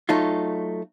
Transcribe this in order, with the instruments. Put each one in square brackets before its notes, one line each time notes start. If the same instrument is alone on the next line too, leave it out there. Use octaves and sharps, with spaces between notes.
[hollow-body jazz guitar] F#3 A3 D#4 F4